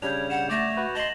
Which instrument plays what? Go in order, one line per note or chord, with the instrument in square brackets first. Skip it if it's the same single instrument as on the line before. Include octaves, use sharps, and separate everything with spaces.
[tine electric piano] C#3 G3 D4 [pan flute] C#5 [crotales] G6 G#6 F7
[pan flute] F#5 [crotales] E7
[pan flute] A3 [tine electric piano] D5 [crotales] A6 A#6 E7
[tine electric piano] F#4 B4
[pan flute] D#5 [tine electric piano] A5 C6 [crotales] E7 F#7